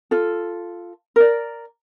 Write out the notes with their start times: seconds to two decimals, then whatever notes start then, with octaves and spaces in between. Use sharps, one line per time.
0.11 F4 A4
1.16 A#4 D5